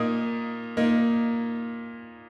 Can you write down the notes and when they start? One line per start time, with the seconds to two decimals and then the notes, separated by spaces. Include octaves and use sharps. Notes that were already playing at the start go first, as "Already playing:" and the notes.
Already playing: A#2 A#3 D#4 D#6
0.77 A#2 A#3 D#4